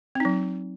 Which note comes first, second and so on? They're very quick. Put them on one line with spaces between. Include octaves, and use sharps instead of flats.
C4 D#4 F#3